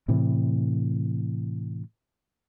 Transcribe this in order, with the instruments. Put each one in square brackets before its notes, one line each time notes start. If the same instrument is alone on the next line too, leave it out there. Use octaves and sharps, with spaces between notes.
[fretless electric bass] A2 C3 E3